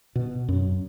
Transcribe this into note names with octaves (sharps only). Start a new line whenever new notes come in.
B2
F#2